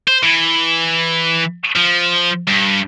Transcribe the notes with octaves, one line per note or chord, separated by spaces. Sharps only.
C5
E3
F3
G2